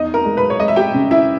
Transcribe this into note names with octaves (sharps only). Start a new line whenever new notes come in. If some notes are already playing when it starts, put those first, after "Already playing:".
Already playing: E2 D#4 D#5
A#4 A#5
G#3
B4 B5
C#5
G#3 D#5
E5
G4 G5
C#3
E4 E5